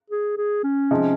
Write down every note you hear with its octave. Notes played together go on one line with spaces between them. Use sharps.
G#4
G#4
C#4
C3 F3 G#3 D#4